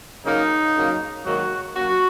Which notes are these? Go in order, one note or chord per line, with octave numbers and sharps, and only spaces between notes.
C#3 F#3 A#3 D#4
F#2 C#3 F#3 A#3
G#2 D#3 F#3 A#3 F#4
F#2 F#3 A#3 C#4 F#4